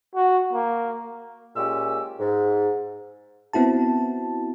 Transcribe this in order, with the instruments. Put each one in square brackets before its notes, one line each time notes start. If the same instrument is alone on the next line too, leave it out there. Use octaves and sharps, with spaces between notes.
[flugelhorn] F#4
A#3
[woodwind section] A#2 G#3 C#4 G4 E6
G#2
[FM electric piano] B3 C4 E4 F#4 A5